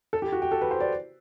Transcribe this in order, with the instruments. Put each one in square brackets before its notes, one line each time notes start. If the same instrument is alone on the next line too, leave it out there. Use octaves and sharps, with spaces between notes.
[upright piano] A4
G4
F#4
G4
A4
B4
C5
D5